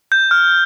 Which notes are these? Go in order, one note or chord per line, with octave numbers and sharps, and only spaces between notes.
G6
F6